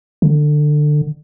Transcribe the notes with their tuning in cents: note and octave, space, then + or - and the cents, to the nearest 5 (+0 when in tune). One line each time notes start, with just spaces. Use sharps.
D3 +20